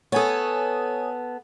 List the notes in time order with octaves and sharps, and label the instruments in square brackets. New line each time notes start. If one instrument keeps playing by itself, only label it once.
[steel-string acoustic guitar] B3 A4 [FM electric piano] C#5 G#5 D#6